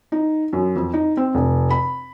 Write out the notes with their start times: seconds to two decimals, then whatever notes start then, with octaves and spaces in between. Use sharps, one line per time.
0.12 D#4
0.53 F#2
0.76 F2
0.94 D#4
1.17 C4
1.35 F1
1.70 B5